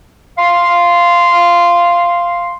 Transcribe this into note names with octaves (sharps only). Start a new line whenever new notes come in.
F5 C6